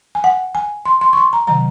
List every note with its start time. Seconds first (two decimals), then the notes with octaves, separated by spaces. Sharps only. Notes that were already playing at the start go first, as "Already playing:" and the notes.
0.15 G#5
0.24 F#5
0.55 G#5
0.86 C6
1.01 C6
1.13 C#6
1.17 C6
1.33 A#5
1.47 C3 D#3 F#3 A#5